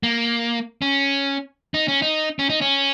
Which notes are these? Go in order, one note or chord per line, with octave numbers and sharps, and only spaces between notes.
A#3
C#4
D#4
C#4
D#4
C#4
D#4
C#4